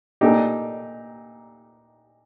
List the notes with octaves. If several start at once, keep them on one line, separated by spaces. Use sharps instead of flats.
A#2 A3 D4 D#4 G4